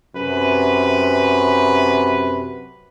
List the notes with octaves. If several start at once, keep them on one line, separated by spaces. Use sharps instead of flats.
F#2 C3 B4